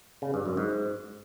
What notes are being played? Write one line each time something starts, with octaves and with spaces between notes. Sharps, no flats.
C#3
G2
F#2
G#2